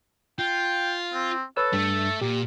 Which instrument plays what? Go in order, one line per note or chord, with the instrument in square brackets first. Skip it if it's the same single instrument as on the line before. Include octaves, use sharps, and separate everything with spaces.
[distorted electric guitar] F4 [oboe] G5
[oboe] C4
[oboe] A4 [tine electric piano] B4 C#5 E6
[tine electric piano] G2 [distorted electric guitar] A3
[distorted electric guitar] A#2 [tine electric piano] G4